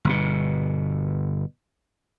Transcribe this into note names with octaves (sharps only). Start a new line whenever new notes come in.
G1 B2